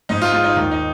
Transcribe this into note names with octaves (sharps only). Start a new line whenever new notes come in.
G#2 D#4
F4
G#3 F4
D#4
D#2 D#4
D#4